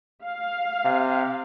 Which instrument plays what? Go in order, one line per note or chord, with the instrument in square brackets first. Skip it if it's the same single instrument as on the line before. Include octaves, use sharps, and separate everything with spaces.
[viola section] F5
[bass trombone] C3